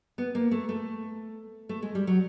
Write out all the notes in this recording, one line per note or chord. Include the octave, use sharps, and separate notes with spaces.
B3
A#3
A3
A3
A3
G#3
G3
F#3